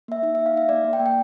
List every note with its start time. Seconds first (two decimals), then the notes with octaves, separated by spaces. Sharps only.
0.08 A#3 E5
0.23 D#4 E5
0.35 D#4 E5
0.46 F5
0.54 D#4 E5
0.69 A#3 D5
0.84 A#3
0.93 G5
1.00 A#3
1.06 G5